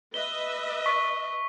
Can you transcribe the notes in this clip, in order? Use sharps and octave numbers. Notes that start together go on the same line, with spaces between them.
B4 D#5 E5 G7
C#6 B6